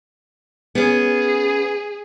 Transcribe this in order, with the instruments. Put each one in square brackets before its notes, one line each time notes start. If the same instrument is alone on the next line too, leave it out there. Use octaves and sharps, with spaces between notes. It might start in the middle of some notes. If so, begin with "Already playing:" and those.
[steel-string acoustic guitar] B3 C#4 [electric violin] G#4